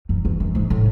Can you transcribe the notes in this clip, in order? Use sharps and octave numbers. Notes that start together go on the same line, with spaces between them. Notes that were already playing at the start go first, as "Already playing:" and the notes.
F#2
E2
F#2
G#2
A2